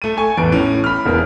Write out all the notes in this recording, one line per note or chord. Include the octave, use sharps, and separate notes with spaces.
A3 D#7
G#5 C#6
A1 E2 D7
A2 C#4
B5 F6
E1 E2 A#4